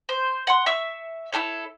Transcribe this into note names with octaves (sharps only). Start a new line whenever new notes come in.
C5
F#5 C6
E5 C#6 E6
E4 G4 A4 C#5